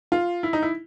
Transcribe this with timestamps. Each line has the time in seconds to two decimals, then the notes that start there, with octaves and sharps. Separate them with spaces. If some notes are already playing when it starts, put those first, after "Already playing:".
0.12 F4
0.43 E4
0.53 D#4
0.62 E4